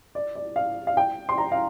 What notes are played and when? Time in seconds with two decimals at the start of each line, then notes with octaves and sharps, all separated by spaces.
0.15 D5
0.35 D5
0.56 F5
0.87 F5
0.97 G5
1.29 C6
1.38 A#5
1.52 F5